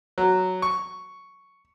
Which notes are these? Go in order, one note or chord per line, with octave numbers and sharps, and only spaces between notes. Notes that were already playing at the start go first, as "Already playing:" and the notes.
F#3
C#6